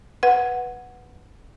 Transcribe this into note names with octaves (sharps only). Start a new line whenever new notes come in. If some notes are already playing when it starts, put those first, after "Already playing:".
B4 F#5